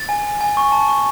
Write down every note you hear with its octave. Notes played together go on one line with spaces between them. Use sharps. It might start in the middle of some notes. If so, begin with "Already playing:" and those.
Already playing: A6
G#5
G#5
G#5
C#6
A5
C#6